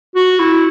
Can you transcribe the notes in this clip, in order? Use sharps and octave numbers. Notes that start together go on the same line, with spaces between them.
F#4
E4